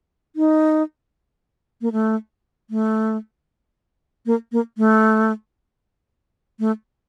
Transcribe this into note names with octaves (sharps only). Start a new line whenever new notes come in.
D#4
A#3
A3
A3
A#3
A#3
A3
A3